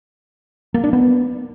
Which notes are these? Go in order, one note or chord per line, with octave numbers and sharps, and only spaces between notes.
A#3
D4
B3